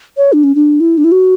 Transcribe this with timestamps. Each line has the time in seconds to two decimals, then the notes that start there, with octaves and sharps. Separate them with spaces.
0.17 C#5
0.33 D4
0.44 C#4
0.55 D4
0.80 E4
0.98 D4
1.04 E4
1.12 F#4